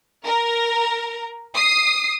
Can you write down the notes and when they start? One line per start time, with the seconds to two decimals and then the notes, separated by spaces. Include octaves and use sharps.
0.25 A#4
1.54 D#6 C7